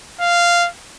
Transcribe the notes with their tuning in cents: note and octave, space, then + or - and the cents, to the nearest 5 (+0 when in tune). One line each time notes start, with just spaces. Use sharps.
F5 -10